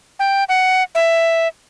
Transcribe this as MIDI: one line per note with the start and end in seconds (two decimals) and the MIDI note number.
0.19 0.44 79
0.49 0.83 78
0.95 1.48 76